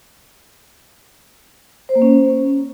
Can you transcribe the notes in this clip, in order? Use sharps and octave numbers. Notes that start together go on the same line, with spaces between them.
C5
A#3
C#4